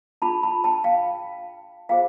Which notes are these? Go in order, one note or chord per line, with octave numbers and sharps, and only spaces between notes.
D4 F4 G#4 A5 B5
A5 B5
G5 A5
F5 G5
F4 G#4 C5 F5 G5